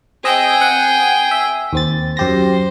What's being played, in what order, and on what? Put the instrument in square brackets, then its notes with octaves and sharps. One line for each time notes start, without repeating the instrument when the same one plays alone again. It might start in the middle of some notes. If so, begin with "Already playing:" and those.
[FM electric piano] C4 D#5 E6 [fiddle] G#4 G5
[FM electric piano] C4 F#5
E5
D#2 C4 A6
[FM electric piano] F#2 G4 A#6 [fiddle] C5